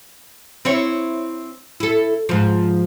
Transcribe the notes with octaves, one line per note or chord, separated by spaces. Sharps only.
C4 E4 C#5
E4 A4
G#2 F3